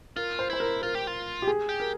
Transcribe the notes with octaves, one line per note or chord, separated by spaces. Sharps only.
F4 A#4
C5
E4 C5
A#4
F4 A#4
G4
F4
G4
G#4
G4
A#4